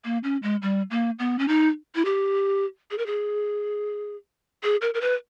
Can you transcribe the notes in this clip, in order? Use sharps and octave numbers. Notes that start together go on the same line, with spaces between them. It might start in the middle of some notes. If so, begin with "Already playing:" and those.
A#3
C#4
G#3
G3
A#3
B3
C#4
D#4
E4
G4
G#4
A#4
G#4
G#4
A#4
A#4
B4